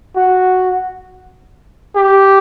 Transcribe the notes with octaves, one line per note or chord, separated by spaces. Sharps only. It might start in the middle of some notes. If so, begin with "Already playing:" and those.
F#4
G4